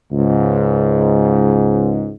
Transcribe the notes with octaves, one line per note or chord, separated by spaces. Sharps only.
C#2 G#2